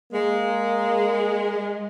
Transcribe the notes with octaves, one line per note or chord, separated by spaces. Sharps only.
G#3 A#3